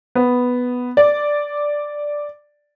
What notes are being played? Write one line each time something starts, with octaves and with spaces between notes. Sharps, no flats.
B3
D5